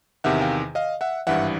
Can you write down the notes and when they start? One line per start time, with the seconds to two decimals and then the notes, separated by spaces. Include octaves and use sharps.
0.24 E2 C3 D#3 E5 F#5
0.41 F5 G5
0.75 D#5 F5
1.01 E5 F#5
1.27 G#1 G2 E3 E5 F#5